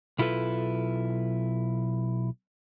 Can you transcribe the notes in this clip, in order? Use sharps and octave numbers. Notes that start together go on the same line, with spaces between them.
B1 E4 F4 A4 B4